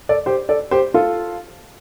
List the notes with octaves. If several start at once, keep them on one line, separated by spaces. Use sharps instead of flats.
A4 D5
G4 C5
A4 D5
G4 C5
F4 A4